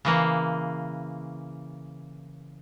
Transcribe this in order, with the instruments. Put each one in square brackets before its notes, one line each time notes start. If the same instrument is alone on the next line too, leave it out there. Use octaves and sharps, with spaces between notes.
[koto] C#3 E3 A#3